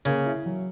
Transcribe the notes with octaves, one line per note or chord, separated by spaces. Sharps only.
C#3 A#3
E4
F#3